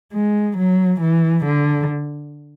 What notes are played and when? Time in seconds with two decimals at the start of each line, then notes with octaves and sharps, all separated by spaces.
0.13 G#3
0.58 F#3
1.01 E3
1.46 D3